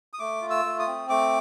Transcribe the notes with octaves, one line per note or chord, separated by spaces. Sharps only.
D#6
A3 D6
F4
E6
A3
D#6
C4
A3 D6